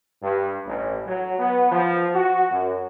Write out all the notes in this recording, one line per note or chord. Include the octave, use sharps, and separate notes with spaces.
G2
A1
F#3
B3
F3
F#4
F#2